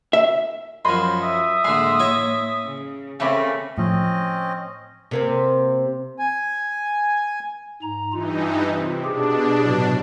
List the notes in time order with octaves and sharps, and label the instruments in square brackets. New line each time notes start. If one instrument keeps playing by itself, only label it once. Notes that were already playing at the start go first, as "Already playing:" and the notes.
[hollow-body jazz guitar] E5
[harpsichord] F#2 F3 [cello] F#3 [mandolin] D#5 B5 C6
[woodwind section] E5 D#6
[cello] A2 A#3 [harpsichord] D3 G#3 [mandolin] C6
[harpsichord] E4 C#5 D#5
[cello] C#3
[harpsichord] C#3 [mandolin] A3 A#3 B5 [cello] C4 C#4
[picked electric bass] A2 F3 [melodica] C4 C#4 D#5
[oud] C3 A#3 C4
[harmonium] G#5
[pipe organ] G#2 A#5
[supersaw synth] G2 E3 D#4 [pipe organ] F4
[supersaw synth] C3
[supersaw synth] B2 D4 [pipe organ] G4 G#4
[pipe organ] A2 C3 F#3